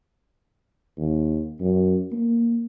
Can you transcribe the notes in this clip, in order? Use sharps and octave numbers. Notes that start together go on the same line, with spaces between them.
D#2
F#2
A#3